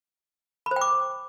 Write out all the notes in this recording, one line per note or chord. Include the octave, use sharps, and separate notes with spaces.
B5
C5
G5
D6